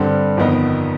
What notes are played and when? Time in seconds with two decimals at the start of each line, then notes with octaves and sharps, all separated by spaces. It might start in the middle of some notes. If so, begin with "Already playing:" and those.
Already playing: G2 D3 G3 C4
0.37 G1 F2 D#3 B3 D#4